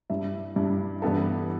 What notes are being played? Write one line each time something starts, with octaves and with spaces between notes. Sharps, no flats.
G2 G3 E4 E5
G2 G3 E4
G2 E3 B3 E4 A4 A5